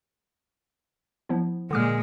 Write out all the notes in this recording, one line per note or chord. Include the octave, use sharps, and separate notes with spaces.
F3 B3 E4
A#2 D3 G#3 D6 F6